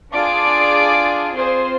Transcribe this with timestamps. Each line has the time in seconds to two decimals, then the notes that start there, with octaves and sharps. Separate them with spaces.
0.13 D4 F4 G#4 D5 D6
1.35 C4 F4 G#4 C5 C6